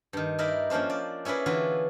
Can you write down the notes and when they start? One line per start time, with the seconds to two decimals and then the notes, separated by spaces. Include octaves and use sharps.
0.13 G2 D#3
0.39 D#4 E4 A#4 D5 E5
0.70 F3 A#3 C#4 D4 C5
0.90 D5
1.25 C#4 E4 G#4 B4 D5
1.46 D3 E3 F4 F#4 B4